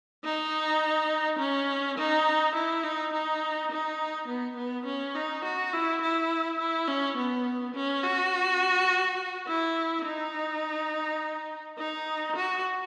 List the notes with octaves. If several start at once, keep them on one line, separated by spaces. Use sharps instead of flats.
D#4
C#4
D#4
E4
D#4
D#4
D#4
B3
B3
C#4
D#4
F#4
E4
E4
E4
C#4
B3
C#4
F#4
E4
D#4
D#4
F#4